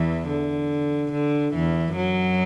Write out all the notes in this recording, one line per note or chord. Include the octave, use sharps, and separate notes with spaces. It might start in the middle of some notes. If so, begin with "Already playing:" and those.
Already playing: E2 E3
D3
D3
E2 E3
F#2 F#3